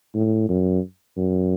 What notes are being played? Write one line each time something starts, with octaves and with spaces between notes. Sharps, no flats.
A2
F#2
F#2